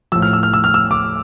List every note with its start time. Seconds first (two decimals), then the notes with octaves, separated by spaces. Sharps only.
0.12 A2 F3 E6
0.22 F6
0.33 E6
0.43 F6
0.54 E6
0.64 F6
0.74 E6
0.91 D6